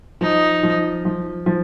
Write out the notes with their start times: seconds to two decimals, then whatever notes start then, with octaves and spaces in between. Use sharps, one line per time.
0.21 F3 D#4
0.63 F3
1.05 F3
1.46 F3